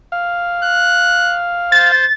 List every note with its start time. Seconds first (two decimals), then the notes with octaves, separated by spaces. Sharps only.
0.12 F5
0.64 F#6
1.72 C5 A6